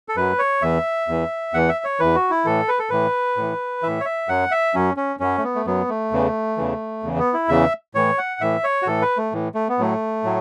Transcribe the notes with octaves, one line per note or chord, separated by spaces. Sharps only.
A4
F#2 F#3 B4
C#5
E2 E3 E5
E2 E3
E2 E3 F#5
E5
C#5
E2 E3 B4
F#4
E4
A2 E3 A4
B4
A4
A2 E3 B4
A2 E3
A2 E3 E5
C#5
E5
F#2 F#3 F#5
E5
F#2 F#3 C#4
C#4
F#2 F#3 C#4
A3
B3
A3
F#2 F#3 B3
A3
E2 C#3 E3
E2 C#3 E3
E2 C#3 E3
B3
E4
E2 C#3 E3 E5
A2 E3 C#5
F#5
A2 E3 E5
C#5
F#4
A2 E3 A4
B4
A3
A2 E3
A3
B3
A2 F#3 A3
A2 F#3